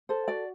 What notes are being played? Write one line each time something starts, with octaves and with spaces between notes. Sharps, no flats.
A4 C5
F#4 D5